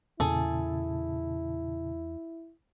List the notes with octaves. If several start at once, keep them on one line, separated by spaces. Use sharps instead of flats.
E2 A#2 C#3 E4 G#4 A4 A5